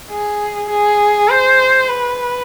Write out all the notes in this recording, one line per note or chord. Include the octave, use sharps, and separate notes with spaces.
G#4
G#4
C5
B4